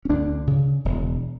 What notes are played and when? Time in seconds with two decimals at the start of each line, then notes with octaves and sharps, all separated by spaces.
0.05 C#4
0.09 D2 D4
0.47 C#3
0.85 E1